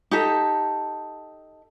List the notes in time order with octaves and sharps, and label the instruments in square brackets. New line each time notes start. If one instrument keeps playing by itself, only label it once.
[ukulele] D#4 G4 A4